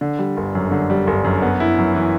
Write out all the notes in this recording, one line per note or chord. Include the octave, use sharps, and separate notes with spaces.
D3
G3
G1
F#2
D3
G3
G1
F#2
B3
E4
F#2
E3